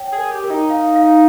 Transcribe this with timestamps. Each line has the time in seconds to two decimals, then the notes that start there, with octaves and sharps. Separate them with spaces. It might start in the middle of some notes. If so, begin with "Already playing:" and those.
Already playing: C#5 G5
0.12 G#4
0.18 A#4
0.31 G4
0.44 A#4
0.50 D#4
0.70 F5
0.95 F5